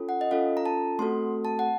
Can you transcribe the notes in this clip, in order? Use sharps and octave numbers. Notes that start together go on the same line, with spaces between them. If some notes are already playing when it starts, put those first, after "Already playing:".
Already playing: C#4 F4 A4
F#5
D#5
C#4 F4 A4 F5
A#5
A5
A3 C4 F#4 A4 C6
A5
F#5